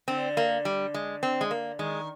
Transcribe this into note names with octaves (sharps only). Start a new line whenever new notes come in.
D3 C4
A#3
G3
G#3
C4
G#3
A#3
D#3 G#3